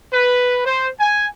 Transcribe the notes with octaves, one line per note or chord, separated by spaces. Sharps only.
B4
C5
G#5